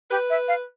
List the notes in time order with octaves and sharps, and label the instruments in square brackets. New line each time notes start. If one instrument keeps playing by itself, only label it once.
[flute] G4 [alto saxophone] B4
[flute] E5
F5